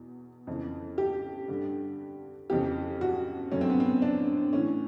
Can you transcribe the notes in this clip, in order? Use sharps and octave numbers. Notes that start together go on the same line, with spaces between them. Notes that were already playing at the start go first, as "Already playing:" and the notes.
Already playing: E2 B2
F2 C#3 E3
G4
G2 D3
F2 C#3 E3 G4
F#4
F#2 D3 C#4
C4
B3
C4
D4
A2 E3 C#4